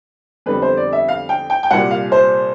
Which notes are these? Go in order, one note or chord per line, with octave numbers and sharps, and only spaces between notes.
F2 D3 G3 B3 B4
C5
D5
E5
F5
G5
G5
G5
C2 A#2 G3 F#5
F5
C5